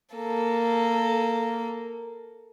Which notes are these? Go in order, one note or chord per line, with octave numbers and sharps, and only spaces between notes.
A#3 A4